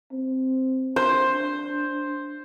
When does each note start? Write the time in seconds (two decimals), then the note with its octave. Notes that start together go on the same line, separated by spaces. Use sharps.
0.12 C4
0.96 D4 C5